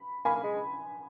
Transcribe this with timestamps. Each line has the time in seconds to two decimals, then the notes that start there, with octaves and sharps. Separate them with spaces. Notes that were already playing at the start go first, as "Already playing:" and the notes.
Already playing: B5
0.25 A#3 G#5 B5
0.35 A#3
0.43 G#3